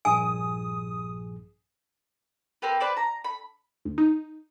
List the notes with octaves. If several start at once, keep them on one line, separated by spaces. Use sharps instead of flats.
A#1 G2 G#4 G#5 D#6
A#3 C4 G4 B4
B4 C5 D5
A#5
B5
D2
D#4